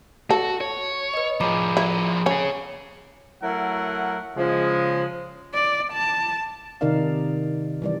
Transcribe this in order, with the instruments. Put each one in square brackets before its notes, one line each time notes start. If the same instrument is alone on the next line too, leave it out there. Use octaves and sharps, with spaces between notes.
[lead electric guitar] F#4 [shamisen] A4
[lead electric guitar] C#5
[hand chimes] B4 D#5
[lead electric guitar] F3 G#4 [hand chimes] A#5 B5 D6
[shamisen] E4
[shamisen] C#4 [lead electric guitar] G#4 C#5
[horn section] F#3 A3 E4 A#4 F#5
C#3 F3 G#3
[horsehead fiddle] D5
A5
[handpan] C3 D#3 D#4 A#4 D5 F5
E3 G3 D5